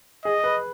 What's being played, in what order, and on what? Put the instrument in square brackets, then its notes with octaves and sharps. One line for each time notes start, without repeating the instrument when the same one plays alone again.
[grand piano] G#4 [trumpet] D#5
[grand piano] B4